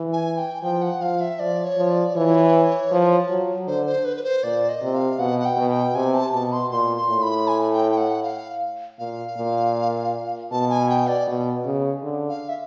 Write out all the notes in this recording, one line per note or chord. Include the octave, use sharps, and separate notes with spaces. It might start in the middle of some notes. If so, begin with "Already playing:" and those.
Already playing: E3
G#5
G5
F3 G5
F#5
F3 F5
E5
F3 D5
C#5
F3
D5
E3 C#5
F3
F#3
D3 C5
C5
B4
B4
C5
A#2 D5
D#5
C3
F5
B2 F#5
F#5
G5
B2
G5
C3 G#5
A5
B2 A5
C6
A#2 C6
C6
A2
B5
G#5
G#5
G5
G5
F#5
F5
A#2 F5
A#2
B2 A5
G#5
G5
D5
B2
C#3
D3
F5
E5